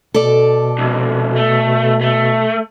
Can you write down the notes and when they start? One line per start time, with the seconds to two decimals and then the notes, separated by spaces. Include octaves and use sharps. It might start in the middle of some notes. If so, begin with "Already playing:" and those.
0.14 B2 A4 D5
0.78 F2 G#2
1.36 A3
2.01 A3